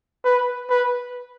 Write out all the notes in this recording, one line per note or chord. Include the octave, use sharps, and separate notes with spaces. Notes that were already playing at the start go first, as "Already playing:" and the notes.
B4
B4